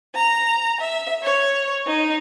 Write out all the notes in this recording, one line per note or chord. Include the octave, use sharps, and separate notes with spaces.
A#5
E5
C#5
D#4